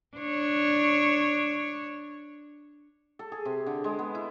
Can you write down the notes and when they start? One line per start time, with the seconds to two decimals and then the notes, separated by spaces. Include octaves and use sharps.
0.17 D4 C#5
3.19 A4
3.32 G#4
3.45 C3
3.66 D3
3.84 G#3
3.99 B3
4.15 E4